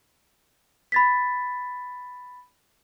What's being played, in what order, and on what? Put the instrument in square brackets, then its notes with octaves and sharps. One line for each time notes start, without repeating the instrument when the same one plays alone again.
[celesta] B5 A6 B6